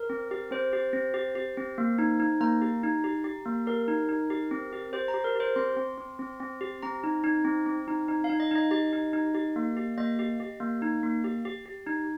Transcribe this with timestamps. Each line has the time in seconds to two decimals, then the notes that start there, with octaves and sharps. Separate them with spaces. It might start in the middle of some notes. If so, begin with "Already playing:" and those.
Already playing: A#4
0.10 C4
0.31 G4
0.51 C4 C5
0.73 G4
0.93 C4
1.14 G4
1.35 G4
1.57 C4
1.78 A#3
1.99 D#4
2.20 D#4
2.40 A#3 A#5
2.62 G4
2.83 D#4
3.04 G4
3.24 G4
3.46 A#3
3.67 G4 A#4
3.88 D#4
4.09 D#4
4.30 G4
4.51 C4
4.73 G4
4.93 G4 C5
5.08 A#5
5.14 G4
5.24 A#4
5.35 G4 C5
5.56 C4 C6
5.77 C4
5.98 C4
6.19 C4
6.40 C4
6.61 G4
6.82 C4 A#5
7.04 D#4
7.24 D#4
7.45 C4
7.66 C4
7.88 D#4
8.08 D#4
8.24 F5
8.29 D#4
8.40 D#5
8.51 D#4 D#5
8.71 G4 D#5
8.93 D#4
9.13 D#4
9.35 G4
9.56 A#3
9.77 G4
9.98 A#3 D#5
10.19 G4
10.40 G4
10.60 A#3
10.82 D#4
11.03 A#3
11.24 G4
11.45 G4
11.66 G4
11.87 D#4